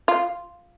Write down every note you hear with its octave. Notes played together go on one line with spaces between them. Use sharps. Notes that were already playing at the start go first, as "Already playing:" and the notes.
F4